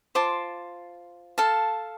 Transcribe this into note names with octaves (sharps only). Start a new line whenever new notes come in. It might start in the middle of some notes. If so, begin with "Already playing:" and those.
F4 C5 A5 D6
A4 F5 A5